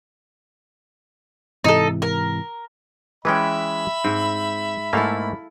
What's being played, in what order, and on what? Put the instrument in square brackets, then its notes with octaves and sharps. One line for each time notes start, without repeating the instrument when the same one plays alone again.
[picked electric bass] G#2 C3 E3 [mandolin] D#4 A4
[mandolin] A#4
[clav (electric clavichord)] E3 G#3 C#4 [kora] B4 G5 [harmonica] E5 B5
[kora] G#2 [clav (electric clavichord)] C4
[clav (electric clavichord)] G#2 A3 A#3 [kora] E4 A4 F5